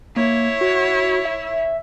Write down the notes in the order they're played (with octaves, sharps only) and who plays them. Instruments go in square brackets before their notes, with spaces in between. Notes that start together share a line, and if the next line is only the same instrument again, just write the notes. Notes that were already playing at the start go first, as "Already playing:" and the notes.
[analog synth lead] A#3 [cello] E4 C#5
[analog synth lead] F#4
E5